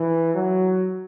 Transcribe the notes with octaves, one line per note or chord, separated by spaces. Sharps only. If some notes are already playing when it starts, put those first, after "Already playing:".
Already playing: E3
F#3